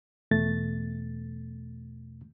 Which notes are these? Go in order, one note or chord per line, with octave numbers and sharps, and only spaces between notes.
E2 B2 A3 A6